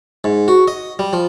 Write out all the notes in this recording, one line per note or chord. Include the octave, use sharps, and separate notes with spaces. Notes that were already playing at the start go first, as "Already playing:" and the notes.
G#2
F#4
D#5
G3
F3